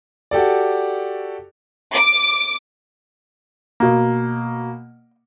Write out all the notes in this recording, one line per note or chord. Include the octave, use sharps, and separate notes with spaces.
F#4 G4 A4 D5
D6
B2 A#3